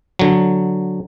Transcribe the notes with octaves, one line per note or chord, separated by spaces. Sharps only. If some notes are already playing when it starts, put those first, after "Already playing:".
D3 F#3